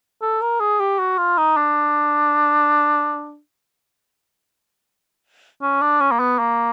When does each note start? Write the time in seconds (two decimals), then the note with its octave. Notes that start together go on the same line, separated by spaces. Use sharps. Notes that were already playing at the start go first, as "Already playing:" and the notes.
0.22 A4
0.41 A#4
0.60 G#4
0.79 G4
0.99 F#4
1.18 F4
1.37 D#4
1.56 D4
5.62 C#4
5.81 D4
6.00 C#4
6.11 A#3
6.19 B3
6.39 A#3